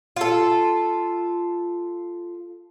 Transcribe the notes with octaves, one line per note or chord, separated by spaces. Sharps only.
F4 A4